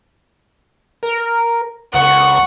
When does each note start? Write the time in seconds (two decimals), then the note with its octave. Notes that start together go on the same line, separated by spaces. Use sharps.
1.03 A#4
1.94 C#2 F#5 C#6